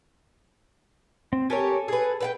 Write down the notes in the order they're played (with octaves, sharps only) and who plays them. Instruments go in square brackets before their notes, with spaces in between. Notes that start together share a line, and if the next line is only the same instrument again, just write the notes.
[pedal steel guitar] C4
[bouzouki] G4 A#4 C#5 [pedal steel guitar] A4 G#5
[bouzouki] G#4 B4
B4 F#5 G5